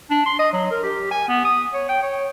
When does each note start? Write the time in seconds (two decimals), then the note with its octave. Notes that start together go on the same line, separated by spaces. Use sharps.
0.10 D4
0.26 C6
0.39 D#5
0.53 F#3
0.71 A#4
0.83 G4
1.11 G#5
1.28 B3
1.45 D#6
1.73 C#5
1.89 G5
2.02 C#5